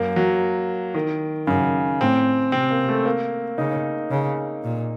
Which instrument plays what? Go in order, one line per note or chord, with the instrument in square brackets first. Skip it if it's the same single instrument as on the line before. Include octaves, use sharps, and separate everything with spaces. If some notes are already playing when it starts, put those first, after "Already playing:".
Already playing: [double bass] F#2 [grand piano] A#3
[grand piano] F#3
D#3
[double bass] F#2 [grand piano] C#3
[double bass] A2 [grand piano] C4
[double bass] C3 [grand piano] C4
[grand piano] A#3
A3
A#3
[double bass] C#3 [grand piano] D#4
[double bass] C#3
A#2